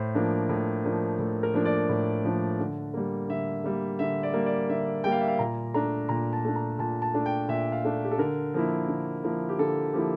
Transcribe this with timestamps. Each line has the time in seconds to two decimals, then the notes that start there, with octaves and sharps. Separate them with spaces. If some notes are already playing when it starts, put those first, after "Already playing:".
Already playing: A2 C5
0.15 F3 A#3 D4
0.49 A2
0.85 F3 A#3 D4
1.19 A2 A4
1.43 A#4
1.54 F3 A#3 D4
1.65 D5
1.89 A2
2.24 F3 A#3 D4
2.60 D3
2.94 G3 A#3
3.29 D3 E5
3.64 G3 A#3
3.99 D3 E5
4.23 D5
4.34 G3 A#3
4.46 D5
4.70 D3 E5
5.04 G3 A#3 G5
5.12 F5
5.21 E5
5.28 F5
5.39 A#2 A#5
5.74 A3 D4 A#5
6.09 A#2 A#5
6.33 A5
6.45 A3 D4
6.56 A#5
6.79 A#2 A5
7.02 A5
7.14 A3 D4
7.26 G5
7.48 A#2 E5
7.72 F5
7.84 A3 D4
8.04 G4
8.12 A4
8.18 D3 A#4
8.54 F3 A#3 E4
8.89 D3
9.24 F3 A#3 E4
9.49 G4
9.59 D3 A4
9.93 F3 A#3 E4 G4